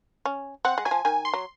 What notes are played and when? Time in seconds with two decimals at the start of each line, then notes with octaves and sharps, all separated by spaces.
0.25 C#4
0.65 C4 F#5
0.78 G#3
0.85 F#3 G#5
0.91 F3
1.05 D#3 G#5
1.25 C6
1.34 F#3